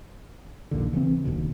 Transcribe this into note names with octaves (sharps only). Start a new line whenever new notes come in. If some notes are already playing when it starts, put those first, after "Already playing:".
A#1 D#2 A#2 D3
C#3 E3 C4
D1 D#2 B2 D3